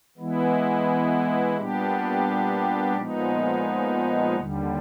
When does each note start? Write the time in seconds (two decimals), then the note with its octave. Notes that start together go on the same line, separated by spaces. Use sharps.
0.18 E3 G#3 B3 E4
1.57 A#2 G3 B3 D4 G4
2.96 A#2 F3 G#3 B3 D#4
4.36 D#2 D3 G3